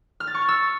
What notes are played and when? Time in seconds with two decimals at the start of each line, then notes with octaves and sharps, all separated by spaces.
0.20 F6
0.27 A6
0.34 C#6
0.41 F6
0.49 E6